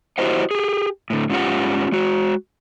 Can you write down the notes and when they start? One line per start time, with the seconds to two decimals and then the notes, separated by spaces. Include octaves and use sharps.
0.18 E4 F#4 G4 C5 D#5 F#5
0.51 G4 G#4
1.10 A2 D3
1.30 G#2 C#4 F4 G4 F#5
1.92 G#3 F#4